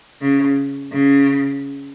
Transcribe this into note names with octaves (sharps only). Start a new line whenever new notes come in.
C#3
C#3